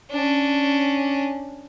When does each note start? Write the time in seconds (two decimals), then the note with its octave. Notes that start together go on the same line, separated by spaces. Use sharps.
0.11 C#4 D4